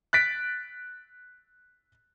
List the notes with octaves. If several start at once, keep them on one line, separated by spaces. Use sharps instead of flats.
F#6 A6 B6 D7